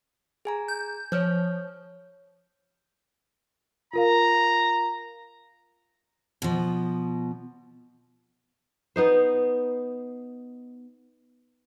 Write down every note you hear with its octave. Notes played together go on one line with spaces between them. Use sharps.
G#4 G#5 A#5
G6
F3 C#5 F6 G6
F4 A#4 F5 A#5
B2 F3
B3 D#4 C5